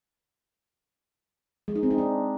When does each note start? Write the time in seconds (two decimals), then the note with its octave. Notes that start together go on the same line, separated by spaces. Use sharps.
1.68 G#3
1.75 D#4
1.83 C4
1.91 D#4
1.98 D4